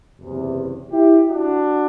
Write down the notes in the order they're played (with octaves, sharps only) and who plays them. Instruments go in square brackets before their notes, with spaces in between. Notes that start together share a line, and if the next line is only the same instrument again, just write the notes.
[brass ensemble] F#1 E2 C3
E4 G4
D4 F#4